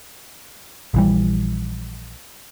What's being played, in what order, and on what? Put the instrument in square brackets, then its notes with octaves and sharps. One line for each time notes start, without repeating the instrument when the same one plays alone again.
[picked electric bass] A#1 E3 G3